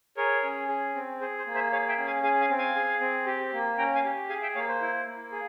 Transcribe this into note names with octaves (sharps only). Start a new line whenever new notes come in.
G#4 A#4 C#5
C#4
G#4
C4
G#4 C5
C5
A#3
C5 E5
G#4 C#5 F5
E5 G5
C#4
F5 G#5
G#4 F5 G#5
F5 G#5
C4
F5 G#5
G#4
C4
G4
A#3
C#4 G5 A#5
F5 G#5
G4
G#4 F5 G#5
E5 G5
A#3 C#5 F5
C5
E4
A#3
G#4